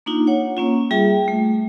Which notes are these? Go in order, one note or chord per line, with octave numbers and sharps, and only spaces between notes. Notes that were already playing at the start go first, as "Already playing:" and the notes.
A#3 D4 D#4 F4
C#5 F#5
A#3 C#4 F4
G3 F4 G#4 E5 G5
A3